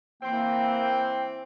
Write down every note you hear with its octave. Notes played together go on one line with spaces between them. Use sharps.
E3 A#3 C4 G5